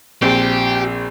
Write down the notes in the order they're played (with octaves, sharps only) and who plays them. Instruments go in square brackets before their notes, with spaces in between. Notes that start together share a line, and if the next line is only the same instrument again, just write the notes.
[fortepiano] A#1 C4 [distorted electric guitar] G4